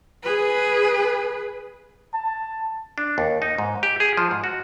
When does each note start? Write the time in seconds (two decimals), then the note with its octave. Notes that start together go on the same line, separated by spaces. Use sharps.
0.23 G#4 B4
2.14 A5
2.98 D4
3.18 D#2
3.42 D#4
3.58 G#2
3.83 G4
4.00 G#4
4.17 F3
4.31 G#2
4.44 F#4